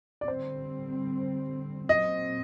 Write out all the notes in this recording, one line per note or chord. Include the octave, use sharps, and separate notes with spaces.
D5
D3 G3 C4 C5
A#2 F#3 C4 D#5